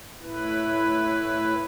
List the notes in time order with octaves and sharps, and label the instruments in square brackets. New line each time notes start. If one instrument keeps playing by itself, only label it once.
[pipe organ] A2 E4 B4